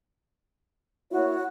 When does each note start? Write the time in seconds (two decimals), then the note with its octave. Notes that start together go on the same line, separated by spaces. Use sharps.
1.12 A#3 E4 F#4 C#5